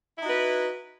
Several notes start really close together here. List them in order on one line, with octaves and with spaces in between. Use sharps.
E4 D#4 F#4 B4